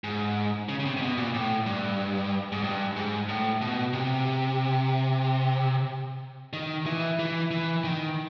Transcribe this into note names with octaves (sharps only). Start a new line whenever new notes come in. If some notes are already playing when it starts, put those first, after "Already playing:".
G#2
C#3
C#3
C3
C3
B2
A#2
A2
G2
G#2
G2
G#2
A2
B2
C3
D#3
E3
E3
E3
D#3